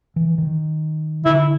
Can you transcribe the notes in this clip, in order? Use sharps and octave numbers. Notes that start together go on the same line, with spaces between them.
E3
D#3
D3 E4